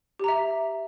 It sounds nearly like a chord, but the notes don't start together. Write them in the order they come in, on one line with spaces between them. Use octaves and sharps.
G4 A#5 E5